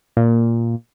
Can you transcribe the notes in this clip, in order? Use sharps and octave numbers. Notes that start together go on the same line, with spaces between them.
A#2